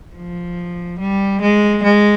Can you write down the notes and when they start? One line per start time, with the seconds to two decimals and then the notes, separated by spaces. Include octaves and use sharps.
0.16 F3
0.99 G3
1.42 G#3
1.83 G#3